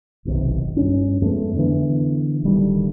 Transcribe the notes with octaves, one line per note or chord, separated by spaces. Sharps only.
F#1 B1 C3 D#3
G2 C#4
F2 G#3 A3 B3
D3 E3 B3
D1 D2 D#3 G3